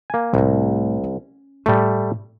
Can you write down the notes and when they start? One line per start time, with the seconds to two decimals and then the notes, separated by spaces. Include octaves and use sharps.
0.10 A#3 G#5
0.34 C2 A2 A3
1.04 C#4
1.66 A2 G3 A3